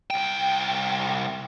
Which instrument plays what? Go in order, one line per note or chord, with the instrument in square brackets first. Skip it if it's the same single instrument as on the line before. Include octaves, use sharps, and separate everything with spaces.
[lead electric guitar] C2 G5